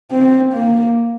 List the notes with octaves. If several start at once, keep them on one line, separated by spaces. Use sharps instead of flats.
C4
A#3